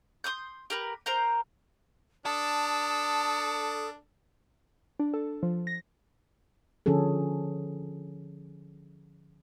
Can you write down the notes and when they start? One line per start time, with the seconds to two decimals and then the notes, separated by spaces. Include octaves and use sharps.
0.24 C6 D6 D#6 G6
0.70 G4 A#4 B4
1.06 A#4 C5 A#5 G6
2.26 D4 A4 D#6
5.00 D4
5.14 A4
5.43 F3
5.67 A#6
6.86 D3 F3 C#4 G#4 A4